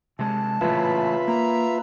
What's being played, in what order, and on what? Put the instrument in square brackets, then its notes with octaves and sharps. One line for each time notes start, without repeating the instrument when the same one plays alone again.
[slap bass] C3 G#3 [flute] A5
[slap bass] A1 A#2 C#3 [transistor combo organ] F4 B4 E5
[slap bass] A#3 [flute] A#5